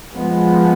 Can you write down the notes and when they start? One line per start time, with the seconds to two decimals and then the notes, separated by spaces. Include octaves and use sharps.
0.14 F3 G#3 B3